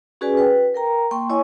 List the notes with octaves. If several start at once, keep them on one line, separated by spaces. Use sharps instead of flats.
C#4 F#4 G#4 B4 D5 G#5
B4 G5
A#4 G5 A#5
A#3 G5 C6 C#6
E4 C#5 D#5 G#5 C#6